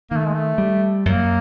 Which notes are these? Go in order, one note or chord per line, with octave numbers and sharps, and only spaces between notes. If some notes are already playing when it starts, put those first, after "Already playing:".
D#3 A#3
A3
G#3
A3
G3
F#2 A#3